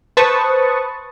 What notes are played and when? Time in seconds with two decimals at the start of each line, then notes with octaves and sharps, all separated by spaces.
0.17 B4 C5 A5 C#6 D#6